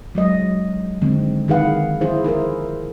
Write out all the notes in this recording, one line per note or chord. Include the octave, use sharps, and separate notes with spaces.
F#3 G#3 D#5
D3 D#3 F3 G#3 C4
D#3 E4 G#4 B4 F5 F#5
F3 E4 G#4 C5
E4 G#4 A#4 C5